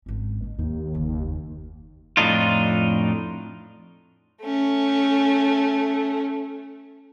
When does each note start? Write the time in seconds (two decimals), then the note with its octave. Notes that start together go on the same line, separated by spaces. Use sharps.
0.06 G#1 C#4
0.45 B2
0.59 D#2 D#4
0.94 F#1 C#3
2.17 F2 A2 D4 D#4 F4
4.41 A3 C#4